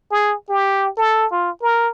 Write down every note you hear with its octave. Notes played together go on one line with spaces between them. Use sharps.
G#4
G4
A4
F4
A#4